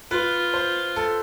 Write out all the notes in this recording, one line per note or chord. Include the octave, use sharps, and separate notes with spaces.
F4 B4
C5
A4